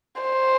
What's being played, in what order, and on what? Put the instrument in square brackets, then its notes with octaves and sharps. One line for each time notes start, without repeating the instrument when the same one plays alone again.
[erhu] C5